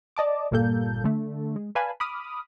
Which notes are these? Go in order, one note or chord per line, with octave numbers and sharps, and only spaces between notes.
D5 D#5 A5 D6
G1 A#2 G3 A#3 A4 G6
D3 A3
G#3
B4 D5 F5 G#5 A5 B5
B5 D6 D#6 F6